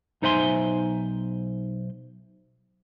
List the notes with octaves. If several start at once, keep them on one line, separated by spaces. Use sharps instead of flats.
B1 D#4 C5 E5 G#5 C6